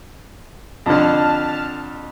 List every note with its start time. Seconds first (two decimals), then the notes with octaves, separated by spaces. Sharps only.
0.86 F2 D3 A5 F6